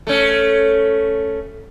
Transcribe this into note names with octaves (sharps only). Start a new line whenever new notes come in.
A3 C#4